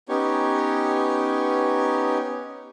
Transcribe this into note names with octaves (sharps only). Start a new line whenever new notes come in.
B3 C#4 D#4 G4 C#5